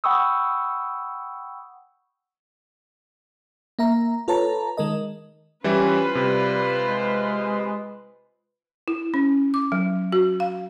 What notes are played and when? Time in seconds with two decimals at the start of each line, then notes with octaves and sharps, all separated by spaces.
0.04 F#5 G5 B5 C#6 D#6 E6
3.79 A#3 E5 A#5
4.28 F4 A4 B4 C#5 A5 A#5
4.78 D#3 G#3 A#4 D#5
5.64 E3 G3 C#4 E4 F4 B4 C5
6.15 C3 G3
6.80 G#3
8.88 E4
9.14 C#4
9.54 D6
9.72 F#3
10.12 F#4
10.40 F5